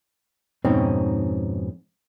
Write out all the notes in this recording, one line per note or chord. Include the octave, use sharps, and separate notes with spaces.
F2 G#2 B2 C4 C#4 D#4